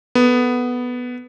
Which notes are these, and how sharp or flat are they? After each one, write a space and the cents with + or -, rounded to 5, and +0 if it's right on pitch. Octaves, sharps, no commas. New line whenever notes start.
B3 +0 A4 +5